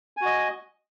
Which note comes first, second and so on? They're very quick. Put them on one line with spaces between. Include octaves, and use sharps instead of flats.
G#5 F#4 D#5